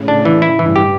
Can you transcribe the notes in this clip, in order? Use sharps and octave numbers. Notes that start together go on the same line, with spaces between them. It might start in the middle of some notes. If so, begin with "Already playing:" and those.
Already playing: A2 C#3
D4
E3
E4
G2 E3
G4